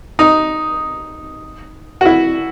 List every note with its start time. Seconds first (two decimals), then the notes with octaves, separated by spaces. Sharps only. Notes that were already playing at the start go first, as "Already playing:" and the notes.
0.19 D#4
2.01 F#4
2.05 E4